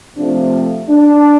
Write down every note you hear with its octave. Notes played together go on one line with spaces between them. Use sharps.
C3 F3 A3 D4
D4